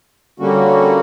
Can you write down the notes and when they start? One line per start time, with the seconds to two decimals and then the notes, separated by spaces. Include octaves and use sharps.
0.39 D3 G3 A#3 C#4 F#4